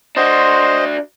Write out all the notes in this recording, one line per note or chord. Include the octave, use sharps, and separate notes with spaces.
D4 F#4 C5 D#5 C6